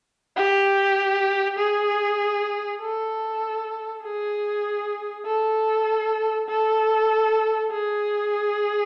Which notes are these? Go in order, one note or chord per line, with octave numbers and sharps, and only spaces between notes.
G4
G#4
A4
G#4
A4
A4
G#4